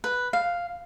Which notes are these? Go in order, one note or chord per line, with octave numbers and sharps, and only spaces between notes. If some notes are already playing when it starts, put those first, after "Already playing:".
B4
F5